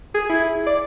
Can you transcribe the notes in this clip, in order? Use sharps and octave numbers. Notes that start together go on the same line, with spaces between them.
G#4
E4
D5